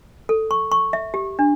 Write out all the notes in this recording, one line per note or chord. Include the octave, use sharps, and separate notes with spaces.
A4
C#6
C#6
E5
G4
D4